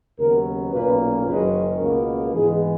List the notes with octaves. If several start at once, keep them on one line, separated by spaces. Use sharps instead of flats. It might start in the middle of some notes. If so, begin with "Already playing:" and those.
D#2 C#3 F#3 B3 A#4
B1 A#2 A#3 C#4 B4
F#1 F#2 D#3 G#3 C#4 B4
C#2 B2 A#3 A#4
G#2 E3 G#3 B3 G#4